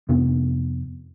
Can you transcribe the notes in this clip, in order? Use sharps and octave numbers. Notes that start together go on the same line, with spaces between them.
F2 C3 B3